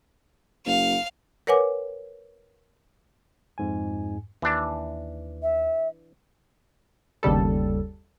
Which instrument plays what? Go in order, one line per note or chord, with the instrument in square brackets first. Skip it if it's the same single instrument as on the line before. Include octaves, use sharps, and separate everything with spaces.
[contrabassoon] F#1 [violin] F5
[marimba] A#4 B4 C#5 F#5 G#5 D6
[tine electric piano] F2 G#2 G#5
[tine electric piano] D#2 [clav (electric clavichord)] E3 D4
[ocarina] E5
[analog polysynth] G1 D#2 C#3 G3 A4